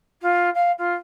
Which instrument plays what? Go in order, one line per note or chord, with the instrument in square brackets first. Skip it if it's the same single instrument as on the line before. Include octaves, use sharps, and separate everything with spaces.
[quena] F4
F5
F4